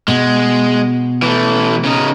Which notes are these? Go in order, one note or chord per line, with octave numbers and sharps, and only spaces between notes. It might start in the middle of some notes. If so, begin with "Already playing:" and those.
B2 G#3
E3 A3
C#3 D#4